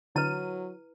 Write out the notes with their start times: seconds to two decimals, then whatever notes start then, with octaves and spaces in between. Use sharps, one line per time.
0.16 D3 F#3 E4 B4 D#7